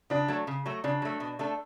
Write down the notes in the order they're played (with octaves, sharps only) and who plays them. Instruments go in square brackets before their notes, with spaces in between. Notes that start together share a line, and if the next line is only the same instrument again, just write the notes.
[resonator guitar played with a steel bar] C#3 [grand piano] D4
[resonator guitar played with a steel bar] F#3 A3
C#3
F#3 A3
[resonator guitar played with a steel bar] C#3 [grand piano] D4
[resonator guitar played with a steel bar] F#3 A3
B2
A3 D4 A4